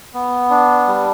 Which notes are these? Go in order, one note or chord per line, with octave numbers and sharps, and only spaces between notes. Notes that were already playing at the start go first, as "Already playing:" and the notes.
B3
D4
G3